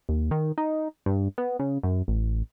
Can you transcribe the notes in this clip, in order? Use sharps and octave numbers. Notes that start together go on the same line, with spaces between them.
D#2
D#3
D#4
G2
B3
C#3
F#2
A1